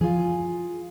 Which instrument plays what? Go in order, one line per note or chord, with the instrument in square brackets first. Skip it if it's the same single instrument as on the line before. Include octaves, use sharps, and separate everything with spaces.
[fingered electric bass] F3 [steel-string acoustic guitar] F4 G#4